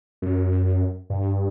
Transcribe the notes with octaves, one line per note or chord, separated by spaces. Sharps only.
F#2
G2